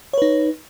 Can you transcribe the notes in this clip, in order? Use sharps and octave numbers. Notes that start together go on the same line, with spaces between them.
D#4 B4 C#5